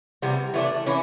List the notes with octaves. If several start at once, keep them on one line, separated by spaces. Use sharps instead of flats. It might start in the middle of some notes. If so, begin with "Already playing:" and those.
C3 E3 G3 B3
E3 A3 D4
E3 C#4 E4